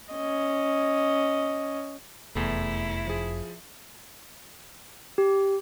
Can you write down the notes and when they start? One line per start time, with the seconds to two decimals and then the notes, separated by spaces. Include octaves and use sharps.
0.13 C#4 D#5
2.35 F1 E2 A3 E4
3.07 F3 G#4
5.18 G4